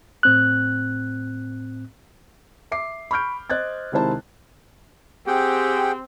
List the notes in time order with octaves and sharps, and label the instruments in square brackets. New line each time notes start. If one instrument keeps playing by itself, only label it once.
[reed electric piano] A2 C4 F#6
[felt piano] E5 D6 C7
B5 C#6 F6 G6 D7
C5 D#5 F#6 G#6 A6
C3 D#3 G#3 E4 C5 A5
[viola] C4 [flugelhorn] G4 [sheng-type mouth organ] G#4 F#5 G5